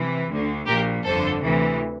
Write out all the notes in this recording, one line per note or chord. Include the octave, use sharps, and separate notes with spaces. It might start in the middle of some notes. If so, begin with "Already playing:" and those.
Already playing: C3 E3
D2 D3
A#1 A#2 G4 A#4
G1 F2 D3 A4 C5
D2 C3 E3